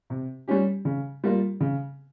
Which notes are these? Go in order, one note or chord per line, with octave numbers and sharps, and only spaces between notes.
C3
G3 C#4 G4
C#3
G3 A#3 F4
C#3